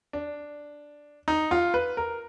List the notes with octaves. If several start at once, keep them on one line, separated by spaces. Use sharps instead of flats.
D4
D#4
F4
B4
A#4